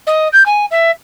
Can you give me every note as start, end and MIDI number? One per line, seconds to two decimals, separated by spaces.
0.07 0.28 75
0.33 0.46 91
0.46 0.66 80
0.71 0.91 76